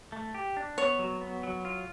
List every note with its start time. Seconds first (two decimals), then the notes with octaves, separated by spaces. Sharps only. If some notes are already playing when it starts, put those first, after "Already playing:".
0.12 A3
0.34 G4
0.57 D4
0.78 B3 C#5
0.99 F#3
1.21 B3
1.43 F#3
1.65 F4